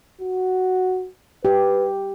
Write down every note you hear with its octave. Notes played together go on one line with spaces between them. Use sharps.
F#4
G4 B4